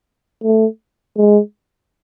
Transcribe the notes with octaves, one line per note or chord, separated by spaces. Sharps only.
A3
G#3